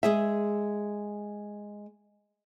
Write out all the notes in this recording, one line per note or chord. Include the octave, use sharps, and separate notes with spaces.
G#3 G#4 E5